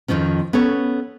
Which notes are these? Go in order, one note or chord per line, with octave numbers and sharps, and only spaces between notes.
F2 G#2 D#3 F3 C#4
B3 C#4 A4 C#5